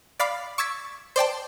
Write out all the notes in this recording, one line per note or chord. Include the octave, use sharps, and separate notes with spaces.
D5 F5 B5 D6
C#6 D6 E6 G#6 A6 B6
C5 D5 G5 A5